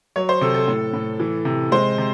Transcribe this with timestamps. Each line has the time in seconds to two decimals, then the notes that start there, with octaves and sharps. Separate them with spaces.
0.16 F#3 C#5
0.29 C5
0.41 C3 A4
0.54 A4
0.68 A2
0.93 A2
1.20 E3
1.45 C3
1.72 G#3 C5
1.98 C3